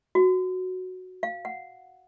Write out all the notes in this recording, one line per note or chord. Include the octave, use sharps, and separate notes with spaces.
F#4
F5
F#5